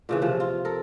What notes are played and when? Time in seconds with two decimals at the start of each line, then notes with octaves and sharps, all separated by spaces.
0.09 A#2 C#3 E3
0.22 C3 F3
0.40 F4
0.65 A4 A#4